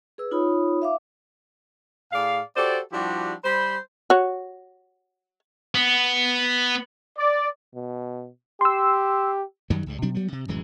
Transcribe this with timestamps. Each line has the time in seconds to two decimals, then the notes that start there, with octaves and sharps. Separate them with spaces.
0.18 G#4 B4 E6
0.31 D#4 F4 C#5 B5 D#6
0.82 E5 F5 D6
2.12 A2 G#4 D5 F5
2.56 F#4 G4 A4 C5 D5
2.93 F3 G3 D4 E4 F#4 G4
3.44 G3 C5 B5
4.10 F#4 C#5
5.75 B3
7.17 D5
7.75 B2
8.61 G4 C6 E6
9.70 F#2 D#3 F#3 G3
9.86 C#2 G2
10.02 B2 F#3 G3 D4
10.15 F#3 G3 B3
10.32 C3
10.48 D1 F#2 E3 G#3